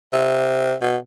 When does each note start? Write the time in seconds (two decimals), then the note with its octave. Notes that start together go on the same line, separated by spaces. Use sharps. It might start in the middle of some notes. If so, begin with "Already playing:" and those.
0.13 C3
0.82 B2